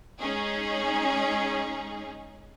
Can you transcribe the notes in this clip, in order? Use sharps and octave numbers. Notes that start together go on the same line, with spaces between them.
G#3 C#4 D#4 G#4